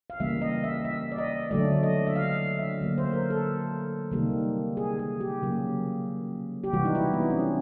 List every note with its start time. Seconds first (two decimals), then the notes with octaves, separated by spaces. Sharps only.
0.10 F5
0.20 C#3 E3 G3 A#3 E5
0.42 D#5
0.64 E5
0.85 E5
1.12 D5
1.18 D#5
1.51 D3 F#3 A3 D5
1.83 D#5
2.07 E5
2.16 F5
2.59 E5
2.81 D3 F#3 A#3
2.98 C5
3.13 A#4
3.30 A4
4.11 C3 D#3 G3 A#3
4.77 G#4
4.99 G#4
5.21 G4
5.42 C#3 F#3 A#3
6.64 G4
6.73 C3 E3 G3 F#4
6.85 D#4
6.95 E4
7.13 B3
7.22 C4
7.30 C#4
7.39 D4